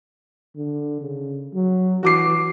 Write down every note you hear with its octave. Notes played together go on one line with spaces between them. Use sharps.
D3
C#3
F#3
E3 F#4 D6 C7